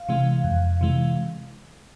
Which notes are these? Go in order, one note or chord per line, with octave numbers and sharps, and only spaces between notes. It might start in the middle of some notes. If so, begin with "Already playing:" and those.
Already playing: F5
C3 E3 G#3
F2
C3 E3 G#3